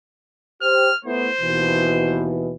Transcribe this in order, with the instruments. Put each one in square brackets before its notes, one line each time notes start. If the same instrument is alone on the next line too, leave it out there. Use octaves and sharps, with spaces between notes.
[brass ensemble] G4 C5 [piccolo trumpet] F6
[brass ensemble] A3 B3 E4 [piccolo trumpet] C5
[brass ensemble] D#2 B2 E3